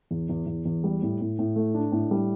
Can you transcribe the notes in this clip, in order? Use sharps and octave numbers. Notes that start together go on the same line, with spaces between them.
E2
E2
E2
E2
G3
A2
A2
A2
A3
D4
A2
G3